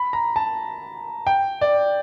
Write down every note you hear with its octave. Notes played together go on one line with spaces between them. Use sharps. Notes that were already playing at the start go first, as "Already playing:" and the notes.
Already playing: B5
A#5
A5
G5
D5